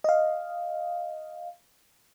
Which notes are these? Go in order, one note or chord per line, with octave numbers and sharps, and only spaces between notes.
D#5 F5